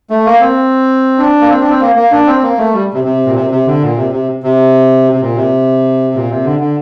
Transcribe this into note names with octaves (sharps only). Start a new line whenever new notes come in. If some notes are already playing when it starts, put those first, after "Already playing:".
A3
A#3
C4
D4
A#3
C4
D4
C4
A#3
A#3
D4
C4
A#3
A3
G3
C3
C3
A#2
C3
C3
D3
A#2
C3
C3
C3
C3
A#2
C3
A#2
C3
D3
D3